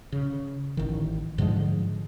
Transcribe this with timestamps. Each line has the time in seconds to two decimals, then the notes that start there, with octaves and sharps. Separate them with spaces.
0.12 C#3
0.77 A1 D#3
1.38 G#2 D3 F3 G#3